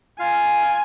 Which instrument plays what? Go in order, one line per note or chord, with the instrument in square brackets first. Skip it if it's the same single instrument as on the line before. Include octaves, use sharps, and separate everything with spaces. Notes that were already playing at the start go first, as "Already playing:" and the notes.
[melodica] F4 F5 [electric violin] G#5